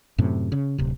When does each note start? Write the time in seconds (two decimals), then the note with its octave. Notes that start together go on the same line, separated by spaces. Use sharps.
0.18 F#2 A2 C3
0.52 C#3
0.78 D1 C3